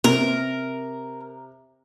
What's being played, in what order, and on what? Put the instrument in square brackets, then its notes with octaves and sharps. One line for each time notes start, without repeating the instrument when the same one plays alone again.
[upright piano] C3 [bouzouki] A#4